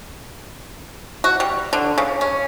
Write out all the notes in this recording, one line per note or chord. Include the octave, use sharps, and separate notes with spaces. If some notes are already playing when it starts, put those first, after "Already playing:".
F#4
G3
D3
C#3
C#4